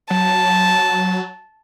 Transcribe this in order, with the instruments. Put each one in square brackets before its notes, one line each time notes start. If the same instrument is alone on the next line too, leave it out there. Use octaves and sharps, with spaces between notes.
[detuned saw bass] F#3 [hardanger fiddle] A5